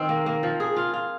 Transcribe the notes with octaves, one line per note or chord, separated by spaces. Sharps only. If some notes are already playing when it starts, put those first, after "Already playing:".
Already playing: D#3 C4
A#3
A#3
F3
G#4
F4
F4